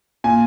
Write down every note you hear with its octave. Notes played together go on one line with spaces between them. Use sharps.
A#2 G#5